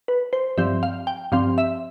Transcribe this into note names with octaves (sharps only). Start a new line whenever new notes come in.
B4
C5
G2 F3 C4 E5
F5
G5
G2 F3 C4 F5
E5